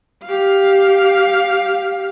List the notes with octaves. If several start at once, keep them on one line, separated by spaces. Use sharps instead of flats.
G4 F5